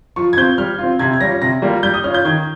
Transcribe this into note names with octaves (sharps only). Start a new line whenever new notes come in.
F3 C#6
G#6
C4 F4 G6
G3 F6
C4 F4
C3 G#6
G#6
G3 C#4 F4 A#6
C3 A#6
G3 A#3 F4
G3 G6
D#6
C#4 F4 F6
G6
D#3 G#6